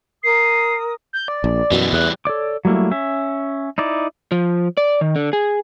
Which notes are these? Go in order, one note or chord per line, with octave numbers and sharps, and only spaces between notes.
A#4 D#6 C7
G6
D5
A#1
F#2 B2 E3 G3
E2 F#6
A4 C#5 D5 D6
F#3 G3 A3 A#3 E4
C#4 E5
D#4 E4 D5
F3
D5
D#3
D3
G#4